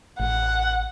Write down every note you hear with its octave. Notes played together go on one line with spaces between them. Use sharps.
A1 F#5